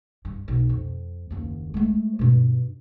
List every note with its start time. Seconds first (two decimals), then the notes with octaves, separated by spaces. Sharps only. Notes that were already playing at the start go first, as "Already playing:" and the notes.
0.25 G2
0.48 B1
0.69 F2
1.30 F#1 D#2
1.74 G#3 A3
2.19 G2 B2